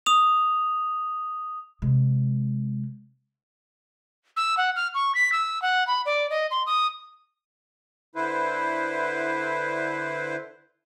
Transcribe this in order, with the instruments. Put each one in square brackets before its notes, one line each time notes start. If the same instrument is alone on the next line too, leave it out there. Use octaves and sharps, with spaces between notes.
[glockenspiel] D#6 F7
[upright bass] C3 G#3
[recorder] E6
F#5
F6
C#6
B6
E6
F#5
B5
D5
D#5
C6
D#6
[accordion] D3 E4 B4 C5